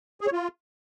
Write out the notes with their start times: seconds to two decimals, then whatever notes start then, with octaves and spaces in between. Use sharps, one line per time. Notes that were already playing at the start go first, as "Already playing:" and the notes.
0.21 G#4
0.27 C#5
0.32 F4